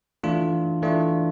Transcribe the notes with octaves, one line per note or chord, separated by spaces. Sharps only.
E3 A3 D4 F4
E3 A3 D4 F4